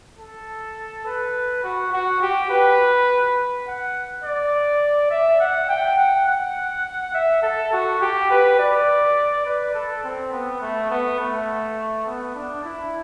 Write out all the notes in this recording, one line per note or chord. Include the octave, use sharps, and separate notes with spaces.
A4
B4
F#4
F#4
G4
B4
F#5
D5
E5
F#5
G5
F#5
F#5
E5
A4
F#4
G4
B4
D5
B4
A4
C4
B3
A3
B3
A3
B3
D4
E4